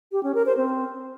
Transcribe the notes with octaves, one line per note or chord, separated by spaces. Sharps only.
G4
C#4
A#4
C5
C4